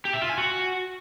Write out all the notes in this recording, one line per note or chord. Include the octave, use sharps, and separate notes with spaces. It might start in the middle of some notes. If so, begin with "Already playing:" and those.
G4
E5
F4
G#5
F#4